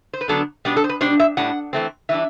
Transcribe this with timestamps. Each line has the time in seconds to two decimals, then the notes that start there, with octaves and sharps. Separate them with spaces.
0.13 C5
0.21 B4
0.28 D3 F#3 B3 D4 A4
0.65 B2 G3 B3 D4 D5
0.76 A4
0.84 C5
0.89 B4
1.01 B2 G3 D4 C5
1.20 E5
1.37 A2 G3 D4 F#5
1.73 E3 A3 C4
2.09 E3 G3 D4 E5